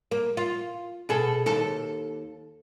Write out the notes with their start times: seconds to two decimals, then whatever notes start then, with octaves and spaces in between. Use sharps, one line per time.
0.11 A#3
0.37 F4
1.09 B2 G#4 A4
1.46 D#2 A4